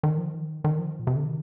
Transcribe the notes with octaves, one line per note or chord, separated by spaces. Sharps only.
D#3
F3
D#3
D#3
F3
A#2
C3
D3
D#3